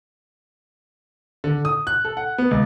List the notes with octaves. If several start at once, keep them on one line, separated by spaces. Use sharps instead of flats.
D3
D#6
F#6
A4
F#5
B3
C#2